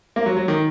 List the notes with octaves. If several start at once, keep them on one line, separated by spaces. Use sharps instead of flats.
A#3
F#3
F#3
D#3